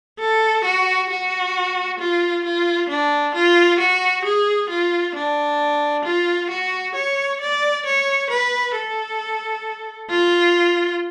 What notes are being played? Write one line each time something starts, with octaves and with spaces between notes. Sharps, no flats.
A4
F#4
F#4
F4
F4
D4
F4
F#4
G#4
F4
D4
F4
F#4
C#5
D5
C#5
B4
A4
F4